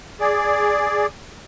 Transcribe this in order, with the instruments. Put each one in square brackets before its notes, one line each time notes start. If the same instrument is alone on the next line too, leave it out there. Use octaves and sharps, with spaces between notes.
[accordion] G#4 D5